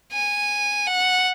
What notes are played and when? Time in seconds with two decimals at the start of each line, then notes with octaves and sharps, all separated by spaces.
0.13 G#5
0.87 F#5